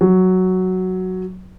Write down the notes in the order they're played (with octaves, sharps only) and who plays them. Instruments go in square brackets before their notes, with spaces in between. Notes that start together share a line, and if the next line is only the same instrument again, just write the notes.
[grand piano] F#3